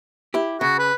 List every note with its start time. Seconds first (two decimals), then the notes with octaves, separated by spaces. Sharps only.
0.34 E4 G4
0.61 C#3 F#4
0.79 B4